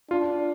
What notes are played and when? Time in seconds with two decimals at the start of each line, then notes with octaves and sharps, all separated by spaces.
0.10 D4 F4